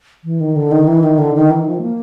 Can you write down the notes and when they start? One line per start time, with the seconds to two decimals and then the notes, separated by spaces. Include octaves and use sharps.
0.24 E3
0.40 D#3
0.55 D3
0.71 D#3
0.87 E3
1.03 D#3
1.18 D3
1.34 D#3
1.50 E3
1.65 F3
1.81 A#3